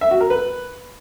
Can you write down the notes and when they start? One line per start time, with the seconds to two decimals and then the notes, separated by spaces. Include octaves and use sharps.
0.01 E5
0.11 F#4
0.21 A#4
0.30 B4